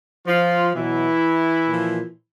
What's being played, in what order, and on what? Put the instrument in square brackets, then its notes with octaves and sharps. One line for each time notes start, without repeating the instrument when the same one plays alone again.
[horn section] F3 F4
B2 E3 F#3 E4
A#2 F3